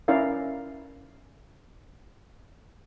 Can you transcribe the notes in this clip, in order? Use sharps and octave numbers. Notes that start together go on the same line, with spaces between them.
C#4 E4 A#4 D5 F5